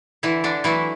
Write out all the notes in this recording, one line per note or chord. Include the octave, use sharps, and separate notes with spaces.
D3 E3 E4
D3 D4
E3 F#3 A3 E4